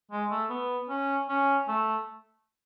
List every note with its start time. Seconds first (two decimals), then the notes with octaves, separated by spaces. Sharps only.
0.11 G#3
0.31 A3
0.50 B3
0.89 C#4
1.29 C#4
1.68 A3